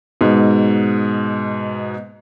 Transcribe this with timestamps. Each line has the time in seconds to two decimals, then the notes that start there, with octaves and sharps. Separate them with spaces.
0.21 G#2 B2